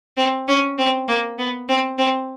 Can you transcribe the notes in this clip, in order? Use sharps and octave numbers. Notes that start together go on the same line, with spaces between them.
C4
C#4
C4
A#3
B3
C4
C4